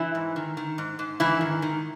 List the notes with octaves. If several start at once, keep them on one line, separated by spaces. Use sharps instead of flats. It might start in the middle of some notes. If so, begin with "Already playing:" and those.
Already playing: E3 E4
G#2
D#3
D#3
G#2
G#2
G#2 E3 E4
D#3
D#3